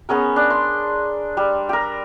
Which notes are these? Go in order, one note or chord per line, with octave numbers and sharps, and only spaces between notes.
B3 C#4 G#4 A#4
D4
C6
G3
G4 A#4